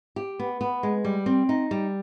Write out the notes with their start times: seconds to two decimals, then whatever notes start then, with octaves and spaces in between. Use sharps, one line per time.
0.16 G4
0.39 B3
0.61 B3
0.83 G#3
1.05 G3
1.26 C4
1.49 D#4
1.71 G3